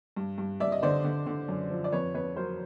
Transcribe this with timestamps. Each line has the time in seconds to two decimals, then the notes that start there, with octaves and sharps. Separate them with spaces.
0.17 G2
0.38 G2
0.60 G2 D5 E5
0.72 D#5
0.82 D3 C5 D5
1.04 D3
1.26 D3
1.48 F#2
1.71 F3
1.84 D5
1.92 F2 B4 C#5
2.15 F2 B4 C#5
2.36 F#3 A#4 C5